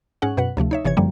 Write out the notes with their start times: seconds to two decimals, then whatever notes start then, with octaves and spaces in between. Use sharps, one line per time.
0.22 G#2 C#4 G#4 F#5
0.37 F#2 B2 B4 F#5
0.57 D2 C3 F3 A3
0.71 D#4 C#5 E5
0.85 G1 C3 E3 C#5 G#6
0.97 F#2 D3 F3 G3 A#3